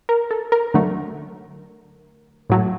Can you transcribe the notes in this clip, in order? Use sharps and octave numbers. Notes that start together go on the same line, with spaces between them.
A#4
A4
A#4
D3 F#3 A3
A2 F#3 A3